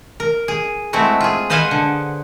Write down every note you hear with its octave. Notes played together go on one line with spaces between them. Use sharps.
A#4
G#4
G#3 A3 C4 E4 F#4
F4 G#4
B4 C5 D#5 F5 F#5 G#5
D3